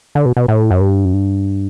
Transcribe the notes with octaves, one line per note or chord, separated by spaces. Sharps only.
D3
B2
B2
A2
F#2
G2
F#2
G2